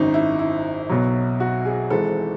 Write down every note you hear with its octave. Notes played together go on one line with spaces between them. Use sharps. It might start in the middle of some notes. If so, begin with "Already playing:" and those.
Already playing: G#1 F#2 D#3 D#4
E4
E4
B1 B2 F#3
F#4
G#4
G#1 G#2 E3 G#3 A4